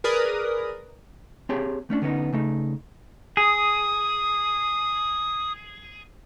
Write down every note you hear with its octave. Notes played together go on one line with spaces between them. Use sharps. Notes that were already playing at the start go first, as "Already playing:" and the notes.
G#4 A#4 B4 D5 D#6
C4 G4 G#4 C#5 A5
A3 C#4 D4
D3 B3 C#4 D#4
C#3 A3 D#4
G#4 D#6